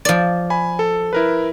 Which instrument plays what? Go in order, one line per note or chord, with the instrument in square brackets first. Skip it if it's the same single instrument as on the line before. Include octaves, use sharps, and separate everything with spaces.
[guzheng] F3 D5
[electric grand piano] G#5 B5
A4
E4 A#4 B4